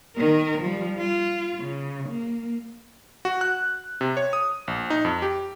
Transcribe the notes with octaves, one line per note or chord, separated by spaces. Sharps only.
D#3 A#4
F3 G3
F4
C#3
A#3
F#4
F#6
C3
C#5
D#6
A#1
D#4
F2
G4